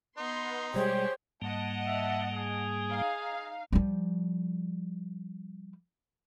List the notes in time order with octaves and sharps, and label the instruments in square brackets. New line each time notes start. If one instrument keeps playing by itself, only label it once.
[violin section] B3 C6 [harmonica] D#4
[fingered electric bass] B2 G3 G#3 [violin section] G4 G#4 C#5 [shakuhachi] C5
[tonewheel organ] G#2 G3 A#3 [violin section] D#5 F#5 A5
[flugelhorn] E5
G#4
[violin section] D#4 F5
[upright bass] F3 G3